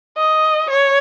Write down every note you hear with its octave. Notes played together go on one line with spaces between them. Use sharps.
D#5
C#5